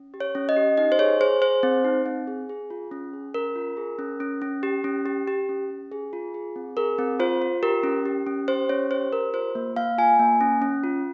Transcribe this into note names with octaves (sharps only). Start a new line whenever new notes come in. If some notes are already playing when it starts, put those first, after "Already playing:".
Already playing: C#4
G4
C#5
C#4
D#5
G4
D#4 D#5
C5
G#4 C#5
G#4 C5
G#4 C5
C4
D#4
C4
G#4
G#4
F4
C#4
G#4
C#4 A#4
F4
G#4
C#4
C#4
C#4
G4
C#4
G4
G4
C#4
C#4
G#4
F4
G#4
C4
G#4 A#4
C4
F4 C5
F4
G4 A#4
C#4
G4
C#4
G4 C5
C#4 C#5
G4 C5
G4 A#4
F4 C5
A#3
A#3 F5
F4 G#5
A#3
C#4
C#4
F4